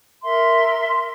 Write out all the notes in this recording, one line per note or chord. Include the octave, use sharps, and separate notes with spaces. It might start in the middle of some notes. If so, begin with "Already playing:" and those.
A#4 E5 C6